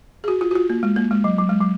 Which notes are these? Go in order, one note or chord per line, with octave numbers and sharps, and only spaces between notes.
G#4
F#4
F4
F#4
F4
A#3
G#3
A#3
G#3
F#3
F#3
G#3
F#3